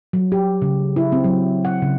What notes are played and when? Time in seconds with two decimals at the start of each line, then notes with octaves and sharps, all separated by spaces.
0.13 F#3
0.32 G4
0.62 C#3
0.96 E4
1.12 C4
1.24 F#3
1.65 F#5
1.82 C#3